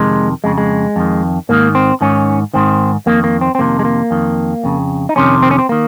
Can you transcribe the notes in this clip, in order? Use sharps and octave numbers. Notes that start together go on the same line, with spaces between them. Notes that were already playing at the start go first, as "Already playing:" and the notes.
Already playing: F2 C3 D#3 G#3
F2 C#3 G#3
G#3
F2 D#3
G#2 D#3 A#3
C4
G#2 D#3 C#4
G#2 D#3 C4
F2 D#3 A#3
A#3
C4
C4
F2 C3 D#3 A#3
G#3
A#3
F2 D#3
F2 C#3
D#4
F2 C3 D#3 C#4
C4
C#4
C4
D#3 A#3